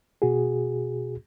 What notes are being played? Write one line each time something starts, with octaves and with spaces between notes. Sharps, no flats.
B2 F#4 G#4